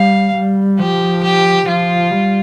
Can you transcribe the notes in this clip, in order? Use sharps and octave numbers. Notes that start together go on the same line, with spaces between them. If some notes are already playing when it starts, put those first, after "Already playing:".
Already playing: G3 F5
G3
F3 G4
G4
F3 F4
G3